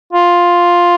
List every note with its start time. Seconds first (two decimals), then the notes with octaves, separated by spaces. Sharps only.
0.13 F4